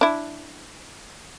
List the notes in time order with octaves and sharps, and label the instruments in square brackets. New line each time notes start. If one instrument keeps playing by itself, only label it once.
[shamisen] D4 E4